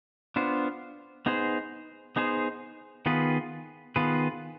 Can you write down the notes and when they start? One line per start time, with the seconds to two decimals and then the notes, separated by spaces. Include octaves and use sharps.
0.36 B3 D4 F4 C5
1.26 B3 D#4 G#4 C5
2.16 B3 D#4 G#4 C5
3.06 D#3 B3 F4 G#4 B4
3.96 D#3 B3 F4 G#4 B4